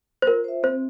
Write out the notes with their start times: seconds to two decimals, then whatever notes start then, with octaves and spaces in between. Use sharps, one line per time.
0.22 C5
0.27 F4 A#4
0.44 C5 E5
0.63 C4 C5